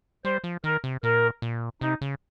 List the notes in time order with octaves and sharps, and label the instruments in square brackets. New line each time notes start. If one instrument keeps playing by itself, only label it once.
[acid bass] G3 [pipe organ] C5
[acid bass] F3
[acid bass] D#3 [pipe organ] A#4
[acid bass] C3
[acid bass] A#2 [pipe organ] A#4
[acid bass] A#2
[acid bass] C3 [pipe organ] D#4
[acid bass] C#3